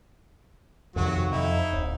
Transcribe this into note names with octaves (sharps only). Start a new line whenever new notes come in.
F2 C3 D#3 F#3 F#4
F2 D#4 E4
D1